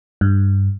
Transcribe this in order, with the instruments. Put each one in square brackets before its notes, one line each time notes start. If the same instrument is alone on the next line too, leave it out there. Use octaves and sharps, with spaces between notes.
[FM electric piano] G2